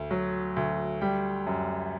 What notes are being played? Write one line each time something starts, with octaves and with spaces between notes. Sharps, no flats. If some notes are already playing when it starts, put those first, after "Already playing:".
Already playing: D2
F#3
D2
G3 G5
F#2